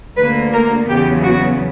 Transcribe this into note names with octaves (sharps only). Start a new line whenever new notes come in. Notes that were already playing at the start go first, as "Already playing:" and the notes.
D2 D3 A#3 B4
A#4
E2 C#3 F#3 B3 G4
F#4